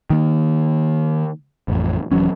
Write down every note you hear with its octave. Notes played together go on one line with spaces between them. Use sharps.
D#3 A#3
A1 F2
D#1 E3 F#3 C#4